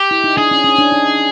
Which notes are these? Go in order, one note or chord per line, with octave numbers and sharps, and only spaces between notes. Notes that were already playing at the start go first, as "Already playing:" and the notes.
Already playing: G4
E4
D#4
D4 G#4
C#4
C#4
D4
D#4